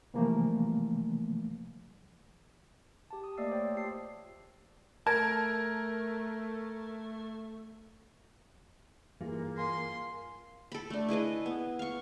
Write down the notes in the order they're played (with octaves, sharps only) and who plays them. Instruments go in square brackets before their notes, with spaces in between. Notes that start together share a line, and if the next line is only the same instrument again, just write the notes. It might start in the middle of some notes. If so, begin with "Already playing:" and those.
[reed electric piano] C3 E3 F3 G3 A3 A#3
[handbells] G4 A5
D#6
A3 A#3 D5 D#5 E6 C7
C5 C#5 G5
F4 G4 A5 C7
[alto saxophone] A3 [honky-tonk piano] A#4 [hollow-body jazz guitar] A5 [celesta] G#6
[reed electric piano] G2 E3 F4 [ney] A#3 [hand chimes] G#4
[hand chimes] A#4 F5 G#5 [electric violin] C6
[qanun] A4 B5
A3 D4
E4 G#4 B4 D#5
B3
F5 C#6